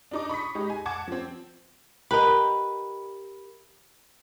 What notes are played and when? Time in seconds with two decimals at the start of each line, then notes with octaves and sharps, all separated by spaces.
0.11 D4 D#4 D6
0.29 B5 C#6 D#6 B6
0.55 G#3 D#4 G4
0.70 G#5
0.85 F#5 A5 D6 G#6
1.08 F3 C4
2.11 G4 A#4 B4 D#5